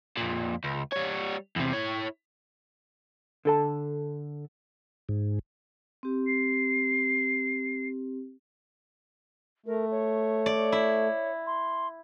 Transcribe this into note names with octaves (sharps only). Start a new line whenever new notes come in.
F2 A#2
C#2
G3 C#5
E2 C3
E4 C#5
D3 A4 A5
G#2
C4 G4
C7
A3 A#4
C#5
D5
E4
C6